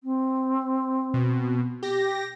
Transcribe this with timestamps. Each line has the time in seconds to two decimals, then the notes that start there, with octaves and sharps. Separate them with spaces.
0.03 C4
1.14 B2
1.83 G4 A#6